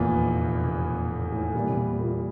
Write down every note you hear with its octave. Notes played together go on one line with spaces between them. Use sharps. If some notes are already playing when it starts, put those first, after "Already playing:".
Already playing: F1 E2 A#2 E3 A#3 F4
C3
A#2
A2
A2
E2 A#2 E3 G3
C3
A#2
A#2